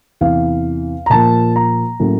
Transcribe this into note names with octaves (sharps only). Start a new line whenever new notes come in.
E2 C3 E3 F5
A#5
A#2 F3 A#3 A5
A#5
A2 F#3 A#3 C#4